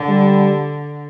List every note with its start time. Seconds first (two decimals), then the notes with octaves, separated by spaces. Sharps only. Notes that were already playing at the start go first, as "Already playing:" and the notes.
Already playing: D3
0.08 G3